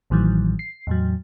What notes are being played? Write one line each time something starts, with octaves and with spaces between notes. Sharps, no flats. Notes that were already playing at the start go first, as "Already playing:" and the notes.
A1 A2 D#3 E3 F#3
C7
E2 A2 F#3